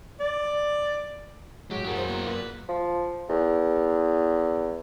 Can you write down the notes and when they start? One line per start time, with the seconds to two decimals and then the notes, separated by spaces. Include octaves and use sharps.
0.20 D5
1.71 A2 F#3 G#3 G4
1.85 F#2 E4 F#4 G#4 A#4
1.96 C5
2.08 A#3
2.27 A#2 B4
2.68 F3
3.29 E2